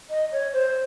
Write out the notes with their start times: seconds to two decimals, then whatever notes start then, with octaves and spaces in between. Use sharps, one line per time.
0.10 D#5
0.32 C#5
0.54 C5